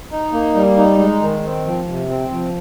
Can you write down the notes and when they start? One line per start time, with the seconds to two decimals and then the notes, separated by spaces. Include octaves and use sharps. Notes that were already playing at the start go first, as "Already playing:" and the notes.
0.11 D#4
0.33 A#3
0.55 G3
0.77 D#4
0.99 G#3
1.21 D#3
1.44 C4
1.66 F3
1.88 C3
2.09 C4
2.32 F3